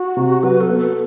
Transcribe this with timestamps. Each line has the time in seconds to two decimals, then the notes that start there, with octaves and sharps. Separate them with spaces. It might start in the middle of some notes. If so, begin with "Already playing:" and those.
Already playing: F#4
0.17 C3
0.43 F#3 B4
0.61 A4
0.69 B3
0.78 A4